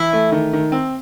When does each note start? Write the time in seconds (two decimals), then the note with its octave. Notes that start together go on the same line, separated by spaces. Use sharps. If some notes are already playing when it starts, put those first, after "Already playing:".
Already playing: E3 E4
0.13 A3
0.32 D#3
0.53 D#3
0.72 C4